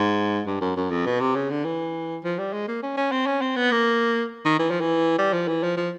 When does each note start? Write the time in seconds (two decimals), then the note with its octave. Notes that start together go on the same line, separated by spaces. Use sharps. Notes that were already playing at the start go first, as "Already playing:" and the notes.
Already playing: G#2
0.47 G2
0.61 F#2
0.77 F#2
0.90 F2
1.06 B2
1.20 C3
1.35 C#3
1.50 D3
1.65 E3
2.24 F3
2.39 G3
2.53 G#3
2.68 A#3
2.83 C#4
2.97 C#4
3.12 C4
3.26 C#4
3.41 C4
3.56 B3
3.71 A#3
4.45 D#3
4.59 E3
4.71 F3
4.81 E3
5.18 G3
5.33 F3
5.48 E3
5.63 F3
5.77 F3